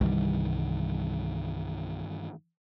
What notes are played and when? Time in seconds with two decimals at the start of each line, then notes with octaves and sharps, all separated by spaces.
0.01 C2 G2 D#3 E3 G3